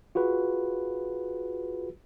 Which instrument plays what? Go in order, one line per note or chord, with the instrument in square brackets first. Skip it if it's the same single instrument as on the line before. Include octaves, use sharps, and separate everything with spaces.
[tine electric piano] F4 F#4 G#4 B4